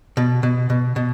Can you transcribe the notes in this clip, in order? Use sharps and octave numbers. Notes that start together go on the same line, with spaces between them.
B2
B2
B2
B2